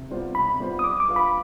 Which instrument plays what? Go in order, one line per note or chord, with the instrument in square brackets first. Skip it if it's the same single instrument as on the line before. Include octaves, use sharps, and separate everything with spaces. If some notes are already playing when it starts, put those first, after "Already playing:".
Already playing: [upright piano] C3
G3 B3 F4 C5
[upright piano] C3 [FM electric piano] B5
[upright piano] G3 B3 F4 C5
[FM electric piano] D#6
[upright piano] G3 [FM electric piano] D6
[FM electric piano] D6
[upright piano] D4 F4 B4 F5
[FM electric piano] B5